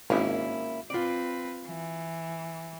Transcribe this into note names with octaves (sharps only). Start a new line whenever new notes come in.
G#1 A#3 C#4 E4
C4 F4 B4 D5
E3